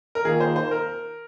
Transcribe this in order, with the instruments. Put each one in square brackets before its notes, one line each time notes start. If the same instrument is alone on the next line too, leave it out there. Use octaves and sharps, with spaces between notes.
[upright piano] A#4
[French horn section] D#3 A#3 F4 [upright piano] G#4
[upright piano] C5
C5
A#4